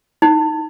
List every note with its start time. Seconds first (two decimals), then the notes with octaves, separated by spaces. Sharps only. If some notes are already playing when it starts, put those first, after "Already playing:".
0.22 D#4